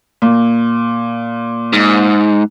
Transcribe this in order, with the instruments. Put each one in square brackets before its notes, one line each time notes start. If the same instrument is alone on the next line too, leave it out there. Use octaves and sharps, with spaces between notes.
[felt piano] A#2
[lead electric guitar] G#2